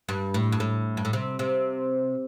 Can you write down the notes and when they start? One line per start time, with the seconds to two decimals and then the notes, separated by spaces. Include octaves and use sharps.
0.09 G2
0.34 A2
0.52 G2
0.60 A2
0.97 G2
1.05 A2
1.13 C3
1.39 C3